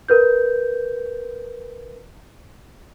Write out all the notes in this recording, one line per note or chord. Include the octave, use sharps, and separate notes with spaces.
A#4 B4 G6